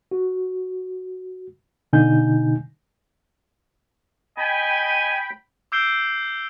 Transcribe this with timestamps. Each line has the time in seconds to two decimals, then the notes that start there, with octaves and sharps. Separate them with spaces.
0.11 F#4
1.93 B2 D3 D#4 G#5 G6
4.38 D#5 G5 G#5 B5
5.72 D6 E6 G6 C7 D7 G7